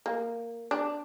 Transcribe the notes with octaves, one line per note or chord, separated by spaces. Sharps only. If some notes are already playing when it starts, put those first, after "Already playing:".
A#3
D4